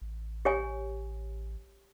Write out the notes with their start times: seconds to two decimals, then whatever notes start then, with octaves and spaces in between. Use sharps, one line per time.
0.02 A1
0.45 G4 C#5 G#5